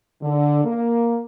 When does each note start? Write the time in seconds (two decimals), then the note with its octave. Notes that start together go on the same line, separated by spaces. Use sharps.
0.22 D3
0.65 A#3